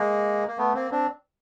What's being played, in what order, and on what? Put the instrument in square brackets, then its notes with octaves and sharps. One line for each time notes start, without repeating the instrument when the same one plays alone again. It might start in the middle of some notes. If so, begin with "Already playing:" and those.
Already playing: [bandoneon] G#3 A#3
A#3
A3 B3
A#3 C4
C4 D4